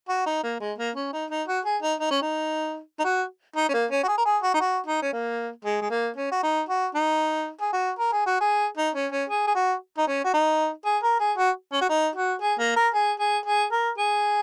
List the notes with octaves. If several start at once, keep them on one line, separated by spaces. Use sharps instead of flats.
F#4
D#4
A#3
G#3
A#3
C#4
D#4
D#4
F#4
G#4
D#4
D#4
C#4
D#4
D#4
F#4
D#4
C#4
A#3
C#4
F#4
G#4
A#4
G#4
F#4
D#4
F#4
D#4
C#4
A#3
G#3
G#3
A#3
C#4
F#4
D#4
F#4
D#4
G#4
F#4
A#4
G#4
F#4
G#4
D#4
C#4
C#4
G#4
G#4
F#4
D#4
C#4
F#4
D#4
G#4
A#4
G#4
F#4
C#4
F#4
D#4
F#4
G#4
A#3
A#4
G#4
G#4
G#4
A#4
G#4